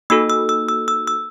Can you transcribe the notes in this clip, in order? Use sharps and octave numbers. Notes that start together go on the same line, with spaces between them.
A#3 D#4 F#4 A4 E6
E6
E6
E6
E6
E6